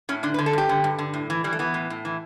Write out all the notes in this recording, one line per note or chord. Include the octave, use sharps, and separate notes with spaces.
A2 C#4
D3 D4
B4
D3
A4
G2 G4
D3
G2
D3
A2
E3
E3 G3
A3
E3 B3
A2
A2
E3